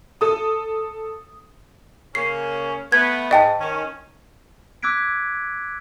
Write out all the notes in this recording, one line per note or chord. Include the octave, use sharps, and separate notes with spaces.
A4 D#6
C#3 A#3 C#4 C7
A3 B3 G#6
G#2 D#5 G5 A5
D#3 C#4
D6 E6 F#6 G#6 B6 D7